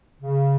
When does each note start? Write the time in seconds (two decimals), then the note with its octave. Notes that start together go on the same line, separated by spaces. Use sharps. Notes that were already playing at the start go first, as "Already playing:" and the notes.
0.22 C#3